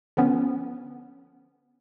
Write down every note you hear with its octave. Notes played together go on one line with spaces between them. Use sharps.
D3 F3 B3 C#4